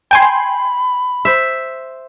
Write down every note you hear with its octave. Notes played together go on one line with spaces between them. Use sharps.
G5 G#5 B5 C6
C5 E5